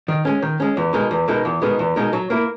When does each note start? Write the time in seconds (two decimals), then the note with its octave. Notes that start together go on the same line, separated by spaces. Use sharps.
0.08 D#3
0.25 G#3 C#4
0.42 D#3
0.60 G#3 C#4
0.77 E2
0.93 B2 G#3 D#4 A#4
1.11 E2
1.28 B2 G#3 D#4 A#4
1.45 E2
1.62 B2 G#3 D#4 A#4
1.79 E2
1.96 B2 G#3 D#4 A#4
2.13 F#3
2.30 A#3 E4 A#4